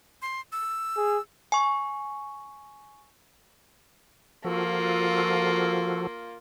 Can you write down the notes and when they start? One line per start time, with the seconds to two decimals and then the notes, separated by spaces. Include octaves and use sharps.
0.22 C6
0.52 E6
0.97 G#4
1.52 G#5 C#6
4.44 F3 A#3 F4 F#4 A4